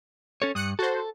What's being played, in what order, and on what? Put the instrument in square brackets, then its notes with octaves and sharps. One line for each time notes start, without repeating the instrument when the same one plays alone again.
[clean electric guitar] C#4 A4 C#5
[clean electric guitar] G2 [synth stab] D#6 F#6 C#7
[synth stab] F#4 C5 [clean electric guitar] A4